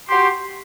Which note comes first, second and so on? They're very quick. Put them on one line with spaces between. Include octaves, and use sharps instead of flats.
C6 G4 F#4